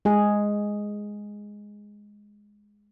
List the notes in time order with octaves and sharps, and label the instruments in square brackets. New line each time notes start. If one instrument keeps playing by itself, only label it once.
[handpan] G#3 G#4